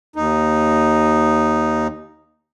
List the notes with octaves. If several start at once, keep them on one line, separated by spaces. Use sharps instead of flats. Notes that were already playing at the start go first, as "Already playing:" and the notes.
D#2 D#4